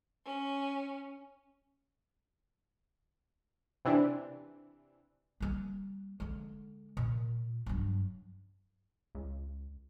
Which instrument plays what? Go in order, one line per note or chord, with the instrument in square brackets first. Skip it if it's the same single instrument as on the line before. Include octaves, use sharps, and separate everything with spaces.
[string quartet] C#4
[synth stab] C3 E3 D4
[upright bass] G3 A#3
D3 G#3
A#2
G2 F#3
[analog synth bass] C#2